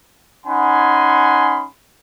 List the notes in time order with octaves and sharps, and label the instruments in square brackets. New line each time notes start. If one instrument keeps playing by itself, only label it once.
[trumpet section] C#4 D#4 F#5 G#5 B5 C6